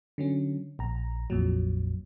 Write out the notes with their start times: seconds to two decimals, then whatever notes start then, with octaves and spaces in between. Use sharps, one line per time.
0.18 D3 F#3 C#4
0.79 A#1 A#5
1.30 A#1 F2 A#2 F#3